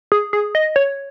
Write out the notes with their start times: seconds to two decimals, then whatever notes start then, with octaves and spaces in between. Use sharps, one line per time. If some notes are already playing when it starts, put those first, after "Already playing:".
0.12 G#4
0.33 G#4
0.55 D#5
0.76 C#5